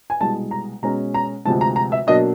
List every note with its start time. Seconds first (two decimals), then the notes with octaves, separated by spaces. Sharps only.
0.10 G#5
0.21 C2 B2 G#3 A5
0.51 A#5
0.83 B2 G#3 C#4 A#5
1.14 A#5
1.45 D2 C3 F3 G#3 A5
1.61 A#5
1.76 A#5
1.92 E5
2.07 B2 F#3 A#3 D4 D#5